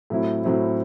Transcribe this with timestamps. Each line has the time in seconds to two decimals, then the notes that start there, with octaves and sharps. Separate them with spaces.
0.10 A2 F#3 C4 E4
0.44 A2 F#3 C4 E4